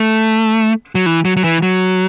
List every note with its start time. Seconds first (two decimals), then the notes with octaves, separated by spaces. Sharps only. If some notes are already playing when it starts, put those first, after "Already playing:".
Already playing: A3
0.95 F#3
1.06 E3
1.25 F#3
1.37 F#3
1.44 E3
1.62 F#3